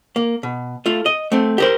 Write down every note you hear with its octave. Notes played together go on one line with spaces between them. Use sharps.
A#3
B2
A3 F4
D#5
A3 C4
G4 A#4 C5